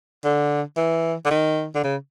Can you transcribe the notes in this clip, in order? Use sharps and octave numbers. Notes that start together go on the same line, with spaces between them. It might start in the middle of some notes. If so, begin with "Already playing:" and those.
D3
E3
D3
D#3
D3
C#3